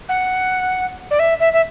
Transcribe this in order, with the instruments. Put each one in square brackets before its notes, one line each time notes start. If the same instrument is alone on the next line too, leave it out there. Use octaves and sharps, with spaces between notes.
[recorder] F#5
D5
E5
E5
E5